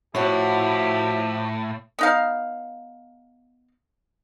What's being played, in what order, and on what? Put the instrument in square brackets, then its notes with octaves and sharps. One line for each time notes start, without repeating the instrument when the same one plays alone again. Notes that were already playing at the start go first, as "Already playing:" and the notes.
[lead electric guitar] A2 [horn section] F3 E4 G4 [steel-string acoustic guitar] F#4 C#5
[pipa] B3 D#4 F5